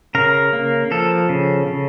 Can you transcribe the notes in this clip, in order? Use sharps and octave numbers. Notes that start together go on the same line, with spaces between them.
C#3 A#4
A#3
F3 A4
C#3
C#3